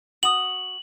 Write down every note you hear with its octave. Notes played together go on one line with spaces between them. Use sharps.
F#4 D#6 F#7